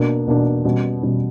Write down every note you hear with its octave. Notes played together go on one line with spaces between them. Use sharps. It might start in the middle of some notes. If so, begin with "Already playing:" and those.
Already playing: B2 A#3 D4
B2 A#3 D4
B2 G3 C#4
B2 G3 C#4